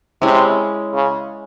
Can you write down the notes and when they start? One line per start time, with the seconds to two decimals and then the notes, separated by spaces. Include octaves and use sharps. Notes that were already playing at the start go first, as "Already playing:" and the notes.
0.22 C3 G#3 C#4 E4
0.94 C#3